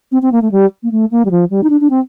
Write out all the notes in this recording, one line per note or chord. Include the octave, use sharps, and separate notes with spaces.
C4
C4
A#3
A3
G3
A#3
A3
A#3
G3
F3
G3
D#4
D4
D4
C4